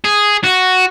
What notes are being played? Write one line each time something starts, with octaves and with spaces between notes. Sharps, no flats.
G#4
F#4